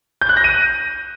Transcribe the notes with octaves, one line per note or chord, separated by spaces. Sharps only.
G6
F#6
A#6
D#7